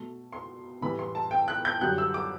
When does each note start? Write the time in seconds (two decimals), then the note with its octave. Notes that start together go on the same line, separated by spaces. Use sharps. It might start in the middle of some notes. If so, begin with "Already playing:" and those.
Already playing: B2 A3
0.33 C6
0.81 A2 E3 G3 B5
0.99 C6
1.15 A5
1.31 G5
1.48 F#6
1.65 G6
1.81 F#2 D3 G3 F#6
1.98 E6
2.14 D6